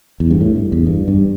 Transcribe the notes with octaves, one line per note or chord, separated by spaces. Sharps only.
E2
G2
A2
G2
E2
G2
G2